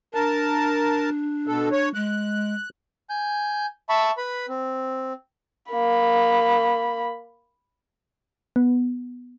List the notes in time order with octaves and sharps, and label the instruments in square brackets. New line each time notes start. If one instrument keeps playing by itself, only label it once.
[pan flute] D4 [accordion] A#4 A5
[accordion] B2 A4
C#5
[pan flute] G#3 [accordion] F#6
[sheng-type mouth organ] G#5 G6
E5 A5 B5 C#6
B4 B5
C4
[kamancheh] A#3 B5
[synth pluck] B3